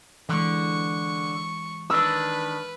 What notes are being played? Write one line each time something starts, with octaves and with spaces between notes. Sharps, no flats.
D3 E3 G#3 C#6
D#3 D4 B4 E6